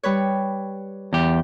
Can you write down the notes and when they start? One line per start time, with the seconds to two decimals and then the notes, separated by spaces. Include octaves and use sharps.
0.03 G3 B4 C#5
1.13 E2 G4